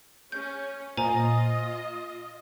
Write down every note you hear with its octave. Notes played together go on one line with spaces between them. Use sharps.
C#4 G6
A#2 F4 C5 D#5 G#5 A#5